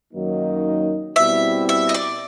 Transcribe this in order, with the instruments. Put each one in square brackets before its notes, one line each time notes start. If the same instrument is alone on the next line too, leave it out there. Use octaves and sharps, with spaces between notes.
[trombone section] F#2 D#3 F#3 A#3 D#4
[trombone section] B2 G3 C4 E4 [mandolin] E5
[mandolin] E5
D#5
D5